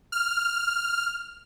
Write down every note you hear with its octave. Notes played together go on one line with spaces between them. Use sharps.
F6